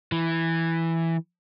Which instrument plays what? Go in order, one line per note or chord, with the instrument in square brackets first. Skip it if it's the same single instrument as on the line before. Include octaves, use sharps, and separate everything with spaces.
[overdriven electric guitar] E3